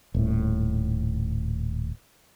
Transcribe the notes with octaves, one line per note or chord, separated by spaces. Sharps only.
D#1 A2